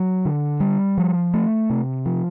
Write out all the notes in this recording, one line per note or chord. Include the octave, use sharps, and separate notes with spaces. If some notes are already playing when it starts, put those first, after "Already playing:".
Already playing: F#3
D3
G3
F3
A3
C3
F3